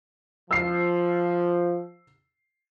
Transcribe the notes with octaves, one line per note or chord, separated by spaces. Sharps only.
F3 E6 C7